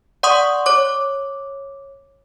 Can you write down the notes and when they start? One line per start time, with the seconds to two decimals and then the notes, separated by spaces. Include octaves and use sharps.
0.23 D5 F#5 C6 C#6 D#6
0.66 C#5 D6